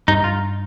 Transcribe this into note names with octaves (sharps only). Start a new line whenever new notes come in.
G2 D#4
F4